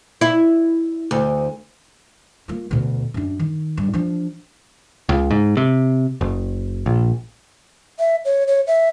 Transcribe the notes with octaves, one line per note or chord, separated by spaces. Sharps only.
E4
D2
A#3 F4
D2 B2
F#2 D4
D#3
G2
F3 D4
C#2
G#2
C3
F#1
A#1
E5
C#5
C#5
E5